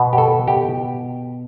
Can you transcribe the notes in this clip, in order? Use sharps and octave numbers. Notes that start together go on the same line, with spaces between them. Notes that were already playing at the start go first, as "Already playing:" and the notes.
Already playing: B2 B3
G4
A4
G4